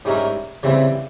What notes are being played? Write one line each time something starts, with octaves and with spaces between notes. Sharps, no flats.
G#2 G3 C#4 E4 A#4
C#3 E3 G3 C4 E4